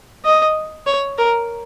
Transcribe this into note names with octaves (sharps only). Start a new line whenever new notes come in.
D#5
C#5
A#4